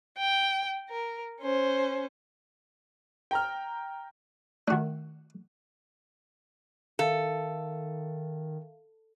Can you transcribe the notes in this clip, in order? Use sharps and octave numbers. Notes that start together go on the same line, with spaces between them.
G5
A#4
C#4 C5
G5 A#5 F6
D#3 A3 D4 F#4
D#3 A4 E5 F5